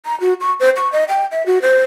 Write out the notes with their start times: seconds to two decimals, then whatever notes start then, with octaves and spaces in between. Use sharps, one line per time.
0.06 A#5
0.21 F#4
0.41 C#6
0.60 C5
0.76 C#6
0.92 D#5
1.09 G5
1.32 E5
1.46 F#4
1.62 C5